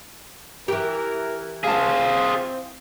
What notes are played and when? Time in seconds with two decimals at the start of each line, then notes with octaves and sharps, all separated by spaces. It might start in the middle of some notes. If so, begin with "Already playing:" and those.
0.68 E3 G4 A#4
1.64 C4 F4 G#4 F5 A5